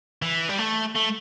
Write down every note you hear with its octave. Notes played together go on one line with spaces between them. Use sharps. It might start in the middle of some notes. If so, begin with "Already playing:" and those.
E3
G3
A3
A3